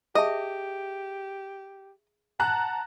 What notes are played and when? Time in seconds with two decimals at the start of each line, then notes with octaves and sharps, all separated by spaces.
0.15 G4 G#4 D#5 E5 A5
2.40 F#5 A5 A#5 F#6